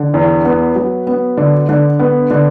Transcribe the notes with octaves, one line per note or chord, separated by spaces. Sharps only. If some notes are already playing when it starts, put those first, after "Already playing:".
Already playing: D3
E2
B3
F#3
B3
D3
D3
B3
D3